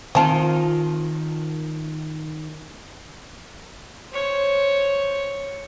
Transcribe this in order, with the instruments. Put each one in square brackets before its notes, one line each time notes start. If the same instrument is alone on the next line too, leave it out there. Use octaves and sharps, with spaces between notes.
[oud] D#3 F4 [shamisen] C4 A5
[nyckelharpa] C5 C#5